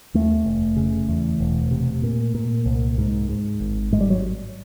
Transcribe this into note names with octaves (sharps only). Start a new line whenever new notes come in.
D#2 A3
F1
C#3
E2
E1
C3
A#2
A#2
C2
G#2
G#2
G#1
G#2 G#3
G3
F#3